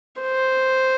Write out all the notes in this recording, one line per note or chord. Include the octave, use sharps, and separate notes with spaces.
C5